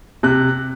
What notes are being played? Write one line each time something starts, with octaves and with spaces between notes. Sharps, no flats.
C3 F#6